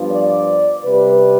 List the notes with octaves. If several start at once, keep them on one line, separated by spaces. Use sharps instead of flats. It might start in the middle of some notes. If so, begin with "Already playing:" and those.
Already playing: G2 F3 B3
D5
C3 G3 C4 B4